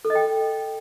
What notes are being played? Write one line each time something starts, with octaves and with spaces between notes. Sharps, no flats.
A4
D#5
G5